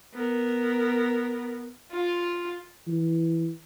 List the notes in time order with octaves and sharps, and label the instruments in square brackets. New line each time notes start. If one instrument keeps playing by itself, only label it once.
[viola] B3 A#4
[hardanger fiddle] F4
[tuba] E3